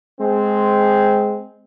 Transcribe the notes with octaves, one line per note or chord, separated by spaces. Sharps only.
G#3 C4